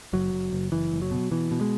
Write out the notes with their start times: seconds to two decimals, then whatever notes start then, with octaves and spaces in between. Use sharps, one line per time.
0.13 F#1 F#3
0.33 F#1
0.53 F#1
0.72 F#1 E3
0.92 F#1
1.02 F#3
1.11 B2
1.31 B2 E3
1.51 B2
1.61 G#3